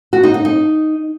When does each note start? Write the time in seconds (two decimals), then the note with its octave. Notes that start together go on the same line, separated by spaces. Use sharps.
0.13 F#4
0.23 D#4
0.34 D#4
0.45 D#4